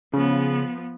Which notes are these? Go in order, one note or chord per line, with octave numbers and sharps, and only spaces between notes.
C#3 F3 B3